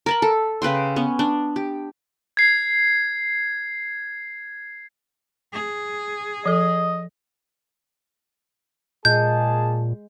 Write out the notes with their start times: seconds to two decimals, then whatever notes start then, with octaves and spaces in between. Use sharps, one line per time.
0.06 A#4 A5 B5
0.22 A4
0.62 C#3 B4 G5 C6
0.96 B3 C#4
1.19 D4
1.56 G4
2.37 G#6 C7
5.53 G#4
6.46 F3 A4 D#5
9.05 A#2 G#3 A#3 G#4 A5 G6